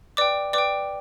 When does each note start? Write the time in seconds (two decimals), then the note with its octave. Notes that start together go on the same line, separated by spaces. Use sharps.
0.17 B4 D5 G5 D6
0.53 B4 D5 G5 D6